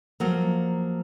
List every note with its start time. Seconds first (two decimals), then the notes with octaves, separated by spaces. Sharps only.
0.20 F3 F#3 A#3